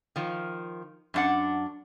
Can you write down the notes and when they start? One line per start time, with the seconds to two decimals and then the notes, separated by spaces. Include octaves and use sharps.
0.16 D#3 F3
1.14 F#2 D4 F#5